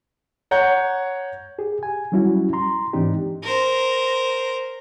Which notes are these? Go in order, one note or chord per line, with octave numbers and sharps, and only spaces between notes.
C#5 F#5 A#5 G6
G4 G#4
G#5
F#3 G3 C#4 E4 F#4
A#5 C6
G#2 E3 C4 D4 D#4 G4
A#4 C5